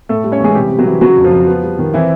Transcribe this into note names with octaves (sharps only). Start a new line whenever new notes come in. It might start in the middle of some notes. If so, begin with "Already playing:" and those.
A2 A3 A4
G3
C#4 C#5
E3 G#3 G#4
C3 G3 G4
C3
F#3 F#4
E3
C#3 F#3 F#4
F2
F3 F4
F2
B3
G3
D#3
E3 C4 E4